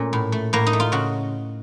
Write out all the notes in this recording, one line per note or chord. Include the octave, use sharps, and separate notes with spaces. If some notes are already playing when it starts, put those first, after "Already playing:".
Already playing: A#2 A3 C#4
A2
A3
A2 A#3
D#4
A3
F4
C#3 F#4